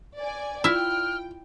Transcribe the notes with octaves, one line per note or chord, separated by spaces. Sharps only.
D5 G#5
E4 F4 E5 G5 F6